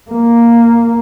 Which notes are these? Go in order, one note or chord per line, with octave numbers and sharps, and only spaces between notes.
A#3